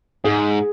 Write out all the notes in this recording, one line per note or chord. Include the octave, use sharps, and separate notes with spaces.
G#2 G#4